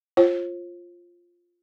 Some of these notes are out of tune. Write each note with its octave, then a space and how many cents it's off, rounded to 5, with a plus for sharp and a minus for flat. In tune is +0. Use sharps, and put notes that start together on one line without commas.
F4 +0 C5 +40